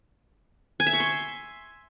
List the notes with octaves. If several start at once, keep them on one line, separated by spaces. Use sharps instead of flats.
G#5
E5
C#6
C6